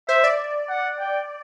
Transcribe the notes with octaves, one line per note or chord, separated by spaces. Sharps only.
C5 E5
D5
F#5
G5